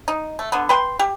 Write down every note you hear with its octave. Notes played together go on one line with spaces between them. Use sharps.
D#4
A3
D3 B3
B4 G5 C6
G4